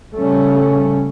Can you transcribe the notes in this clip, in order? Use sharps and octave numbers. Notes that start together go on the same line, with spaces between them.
C#3 G3 A3 C#4